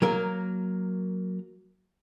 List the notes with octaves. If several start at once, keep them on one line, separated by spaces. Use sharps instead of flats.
F#3 A#3 A#4